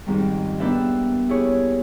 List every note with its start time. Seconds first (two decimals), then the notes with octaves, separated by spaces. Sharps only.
0.06 F2 G#2 D#3 G3
0.60 A#3 B3 D4 B4 E5 G5
1.29 E4 G4 G#4 C#5